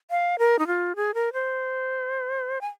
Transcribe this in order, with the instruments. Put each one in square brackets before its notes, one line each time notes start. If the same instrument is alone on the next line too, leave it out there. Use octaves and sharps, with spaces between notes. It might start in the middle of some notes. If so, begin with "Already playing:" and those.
[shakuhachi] F5
A#4
D#4
F4
G#4
A#4
C5
G#5